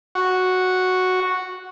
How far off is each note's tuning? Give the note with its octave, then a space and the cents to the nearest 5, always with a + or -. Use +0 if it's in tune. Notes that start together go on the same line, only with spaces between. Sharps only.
F#4 -5